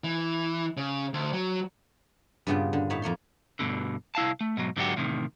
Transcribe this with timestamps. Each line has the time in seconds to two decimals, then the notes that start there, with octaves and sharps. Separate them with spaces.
0.04 E3
0.77 C#3
1.14 D2
1.33 F#3
2.47 G2 A#2 C#3 B3 F4 G5
2.73 D3
2.90 A2 D#4 C#5 A5 B5
3.02 F2 A#3 C#5 C6
3.59 G2 B2 D3
4.15 C2 E4 F5 A5
4.41 A3
4.57 G#2 B2 F#3
4.76 G#2 D3 F#3 D4 F#4 G4
4.96 E2 A2 C3 D#3